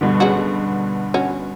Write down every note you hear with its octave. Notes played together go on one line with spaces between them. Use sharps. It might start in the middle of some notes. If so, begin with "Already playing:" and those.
G2 B2 D3
C#3 F#3 F#4
C#4 F#4